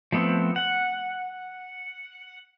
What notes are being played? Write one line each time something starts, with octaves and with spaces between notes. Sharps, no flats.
F3 A3 B3 C4
F#5